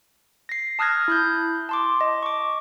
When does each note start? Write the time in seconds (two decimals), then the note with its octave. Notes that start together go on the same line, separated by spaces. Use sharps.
0.49 A#6 C7
0.79 A5 D#6 F6 F#6 G#6 A#6
1.08 E4 F#6 G6
1.69 A5 C6 D6
2.01 D#5
2.23 C#6 D6